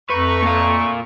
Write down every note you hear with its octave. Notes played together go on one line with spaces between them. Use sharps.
F2 A3 B4 A#5 C#6
A#2 F5